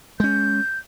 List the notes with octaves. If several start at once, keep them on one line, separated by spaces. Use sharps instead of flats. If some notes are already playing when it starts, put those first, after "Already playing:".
G#3 C#4 G6